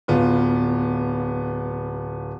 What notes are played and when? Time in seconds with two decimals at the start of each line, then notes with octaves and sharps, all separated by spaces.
0.08 D1 B3 F4